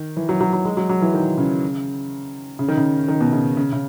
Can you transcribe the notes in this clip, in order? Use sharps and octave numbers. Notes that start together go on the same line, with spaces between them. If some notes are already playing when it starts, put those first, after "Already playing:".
Already playing: D#3
E3
F#3
F#3
F#3
G#3
F#3
F#3
E3
D#3
C#3
C#3
D#3
C#3
D#3
B2
C#3
C#3
C#3